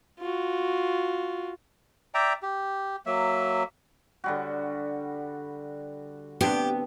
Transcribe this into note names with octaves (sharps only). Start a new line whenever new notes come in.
F4 F#4
D5 E5 G5 A#5
G4
F#3 A#3 E5
D3 G3 F#4
B3 C4 D4 G4